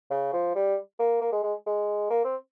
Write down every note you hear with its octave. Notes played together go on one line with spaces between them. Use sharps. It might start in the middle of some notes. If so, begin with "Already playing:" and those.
C#3
F3
G3
A#3
A#3
G#3
G#3
G#3
A#3
C4